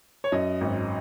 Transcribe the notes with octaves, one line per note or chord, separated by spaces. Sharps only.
C#5
F#2 D#5
G#1